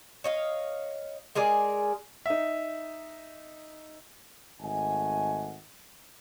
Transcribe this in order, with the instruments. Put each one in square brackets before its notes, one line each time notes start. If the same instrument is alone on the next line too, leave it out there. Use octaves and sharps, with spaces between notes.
[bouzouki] C#5 D#5 F5
G#3 G#4 A#4 D5
[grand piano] D#4 E5
[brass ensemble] G#1 A3 D#5 F#5 G#5